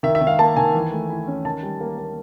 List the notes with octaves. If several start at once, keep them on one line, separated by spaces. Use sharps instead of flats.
D#3 E5
E5
D#3
F5
A#3 A5
D#3 G#5
E3
A3
E4
C#4
D#3 A5
G3
A#3
A#3